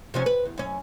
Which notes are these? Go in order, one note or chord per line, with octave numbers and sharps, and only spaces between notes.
C3 F3 C#4
B4
E2
F#2 C#4